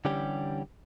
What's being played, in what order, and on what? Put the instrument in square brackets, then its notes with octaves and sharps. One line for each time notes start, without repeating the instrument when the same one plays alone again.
[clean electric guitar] D3 E3 G3 C#4 G4